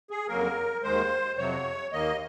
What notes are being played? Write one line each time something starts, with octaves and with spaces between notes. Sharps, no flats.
G#4
F2 C#3 F#3 A#3 A#4
D#2 D#3 G#3 C5
F2 C3 F#3 C#5
D#2 D#3 A#3 D#5